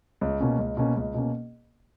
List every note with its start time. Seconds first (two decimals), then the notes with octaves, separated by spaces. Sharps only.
0.21 C#2
0.40 B2 A#3 C#4
0.59 C#2
0.77 B2 A#3 C#4
0.96 C#2
1.14 B2 A#3 C#4